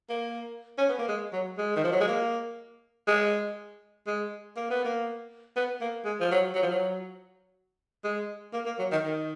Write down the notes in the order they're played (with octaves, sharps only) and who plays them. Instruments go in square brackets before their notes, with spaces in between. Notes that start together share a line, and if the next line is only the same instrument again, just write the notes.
[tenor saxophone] A#3
C#4
B3
A#3
G#3
F#3
G#3
D#3
F3
F#3
G#3
A#3
G#3
G#3
A#3
B3
A#3
B3
A#3
G#3
F3
F#3
F#3
F3
F#3
G#3
A#3
A#3
F#3
D#3
D#3